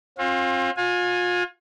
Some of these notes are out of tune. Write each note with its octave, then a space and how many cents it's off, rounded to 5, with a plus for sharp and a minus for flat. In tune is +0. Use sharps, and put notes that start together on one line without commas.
C4 +40 F4 +25
F4 +35 G#5 +0